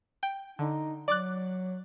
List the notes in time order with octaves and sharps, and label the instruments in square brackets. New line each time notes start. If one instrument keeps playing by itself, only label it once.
[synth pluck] G5
[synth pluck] D3 [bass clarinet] D#4
[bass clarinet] F#3 [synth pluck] D5 D6 F#6